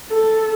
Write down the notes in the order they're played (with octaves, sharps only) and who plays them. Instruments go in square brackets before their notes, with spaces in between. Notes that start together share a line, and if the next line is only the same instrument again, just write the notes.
[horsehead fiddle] A4